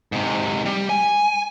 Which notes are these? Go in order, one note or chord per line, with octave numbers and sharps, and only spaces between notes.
G#2 C3
G3
G#5